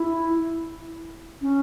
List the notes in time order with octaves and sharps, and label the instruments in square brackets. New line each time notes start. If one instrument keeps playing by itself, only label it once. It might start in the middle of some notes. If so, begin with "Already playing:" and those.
Already playing: [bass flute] E4
C#4